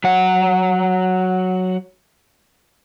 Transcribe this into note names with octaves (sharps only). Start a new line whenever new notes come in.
F#3 F#5